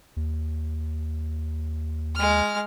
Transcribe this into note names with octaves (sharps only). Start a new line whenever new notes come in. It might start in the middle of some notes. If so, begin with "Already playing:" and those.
D#2
G#3 F6